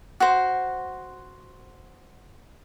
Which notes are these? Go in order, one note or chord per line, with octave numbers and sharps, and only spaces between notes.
F#4 C5